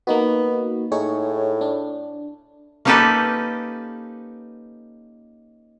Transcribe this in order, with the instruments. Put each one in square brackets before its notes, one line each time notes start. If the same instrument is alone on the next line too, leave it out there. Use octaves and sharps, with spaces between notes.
[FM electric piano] A#3 D#4 F#4 [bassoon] B3
[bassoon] A2 [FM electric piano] D#4 G#4 C#5
[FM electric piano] D4
[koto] A#3 C#4 D#4 G4 A4 B4